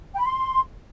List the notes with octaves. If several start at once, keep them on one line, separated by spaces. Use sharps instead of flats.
G5
B5
C6